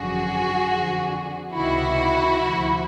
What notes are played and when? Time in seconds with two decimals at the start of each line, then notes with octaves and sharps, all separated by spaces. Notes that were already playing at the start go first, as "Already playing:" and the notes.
Already playing: G#1 F#2 D3 F3 F#4 G#4
0.68 F2 D3 F3
1.53 C#2 C3 D#3 E4 F#4
2.38 D2 C3 F3